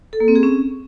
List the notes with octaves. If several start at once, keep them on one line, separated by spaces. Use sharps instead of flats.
A4
A#3
C4
G#4
C#4